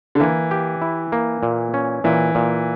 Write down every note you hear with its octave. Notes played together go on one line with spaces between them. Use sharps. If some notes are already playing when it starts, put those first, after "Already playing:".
D3
E3 A#3
G4
E4
A#3
A#2
C#4
A#2 E3
A#2